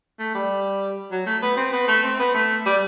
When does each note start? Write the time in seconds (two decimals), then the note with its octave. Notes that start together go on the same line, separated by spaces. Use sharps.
0.19 A3
0.34 G3
1.12 F#3
1.26 A3
1.42 B3
1.57 C4
1.73 B3
1.88 A3
2.04 C4
2.19 B3
2.34 A3
2.66 G3